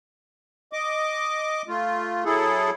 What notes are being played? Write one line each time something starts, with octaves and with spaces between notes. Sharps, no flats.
D#5 D6
A3 F4
F#3 E4 G#4 A4